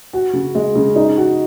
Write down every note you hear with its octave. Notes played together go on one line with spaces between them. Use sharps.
F#4
C#3
G#3
C#3
D#4
F#4